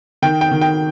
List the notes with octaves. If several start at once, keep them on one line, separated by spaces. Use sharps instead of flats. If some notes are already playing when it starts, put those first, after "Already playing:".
D#3 G5
G5
D#3
G5